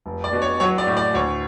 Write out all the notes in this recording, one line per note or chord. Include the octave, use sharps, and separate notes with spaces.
F1
D5
B2
C#5
F#3 C#5
D5
A2
D5
D2 C#5